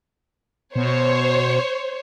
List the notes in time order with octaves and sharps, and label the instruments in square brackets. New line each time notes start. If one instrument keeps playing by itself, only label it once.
[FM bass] B2 [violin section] C5 C#5